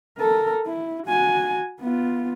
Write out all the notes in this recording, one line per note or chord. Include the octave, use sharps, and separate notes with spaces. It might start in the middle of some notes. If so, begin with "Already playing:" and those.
A4 A#4
E4
F#4 G#5
B3 F4